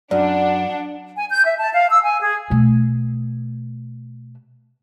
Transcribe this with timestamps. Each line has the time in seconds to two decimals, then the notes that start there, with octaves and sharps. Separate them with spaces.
0.11 F#2 D4 D5 F#5
1.17 G#5
1.30 G6
1.46 E5
1.59 A5
1.73 F5
1.91 E6
2.03 G#5
2.22 G#4
2.50 B2 A3